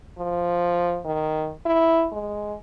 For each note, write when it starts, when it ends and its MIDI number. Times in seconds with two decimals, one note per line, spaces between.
0.18 1.00 53
1.05 1.51 51
1.66 2.07 64
2.12 2.54 56